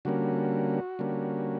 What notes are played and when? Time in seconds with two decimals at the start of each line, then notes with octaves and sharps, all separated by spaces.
0.05 D3 G3 A#3 C#4 F#4
0.99 D3 G3 A#3 C#4